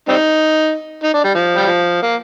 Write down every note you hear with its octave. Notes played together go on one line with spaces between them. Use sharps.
G3 C4 D#4
D#4
D4
G3
F3
G3
F3
A#3